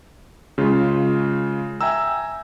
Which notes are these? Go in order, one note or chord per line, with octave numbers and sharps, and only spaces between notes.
C#3 G#3 F4
E5 G5 G#5 A#5 E6